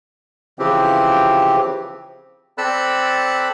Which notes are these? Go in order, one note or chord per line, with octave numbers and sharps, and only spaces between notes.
C#3 E3 F3 C4 G4
C4 A4 D5 B5 E6 F#6